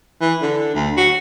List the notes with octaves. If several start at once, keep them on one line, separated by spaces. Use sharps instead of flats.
E3
D3
D2
F#4